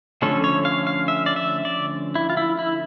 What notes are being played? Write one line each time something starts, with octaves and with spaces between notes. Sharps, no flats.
D3 F3 A3 C#4 A4
C#5
F5
F5
E5
D5
E5
D5
E4
F4
E4
E4